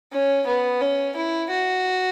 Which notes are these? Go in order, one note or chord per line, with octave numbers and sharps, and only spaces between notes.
C#4
B3
C#4
E4
F#4